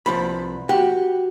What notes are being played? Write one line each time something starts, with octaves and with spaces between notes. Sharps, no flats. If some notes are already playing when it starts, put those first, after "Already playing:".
C2 F3 B4 B5
F#4 G4 F#5